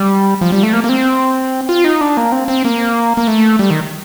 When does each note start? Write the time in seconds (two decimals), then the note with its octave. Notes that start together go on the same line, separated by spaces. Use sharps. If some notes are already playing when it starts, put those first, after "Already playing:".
Already playing: G3
0.41 F3
0.52 G3
0.63 A3
0.73 A#3
0.84 A#3
0.89 C4
1.69 F4
1.84 D#4
2.01 D4
2.17 A#3
2.32 C4
2.48 C4
2.65 A#3
3.17 A#3
3.27 A3
3.59 G3
3.71 D#3